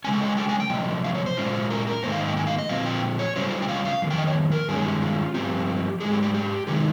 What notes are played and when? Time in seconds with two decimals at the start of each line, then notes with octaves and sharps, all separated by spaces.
0.04 C#3 G#3 C#4 G#5
0.13 G5
0.21 D#5
0.29 G#5
0.37 G5
0.49 G#5
0.60 G5
0.70 C3 F3 A#3 D#5
1.04 F5
1.15 C#5
1.26 C5
1.37 A#2 G#3 C#4 F4
1.70 A#4
1.87 A#4
2.03 G#2 D#3 A#3 D#4 C5
2.12 F5
2.20 D#5
2.28 G5
2.37 G#5
2.47 F5
2.58 D#5
2.69 A#2 F3 C4 F4 F5
2.86 G5
3.19 C#5
3.36 C#3 G3 C#4 F4 C5
3.62 G5
3.68 F5
3.85 F5
4.02 F2 D#3
4.10 G5
4.18 D#5
4.27 C#5
4.52 A#4
4.68 G2 D#3 G#3 C#4 G#4
4.84 G4
5.02 F4
5.34 G2 F3 C4 G4
6.00 G#2 F3 G#3 G#4
6.12 G4
6.23 G4
6.34 G4
6.67 C3 D#3 G#3 D#4 G#4